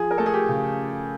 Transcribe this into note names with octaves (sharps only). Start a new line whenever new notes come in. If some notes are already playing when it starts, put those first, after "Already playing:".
Already playing: F3 G#4
A#4
A3 A4
G#4
G4
C#3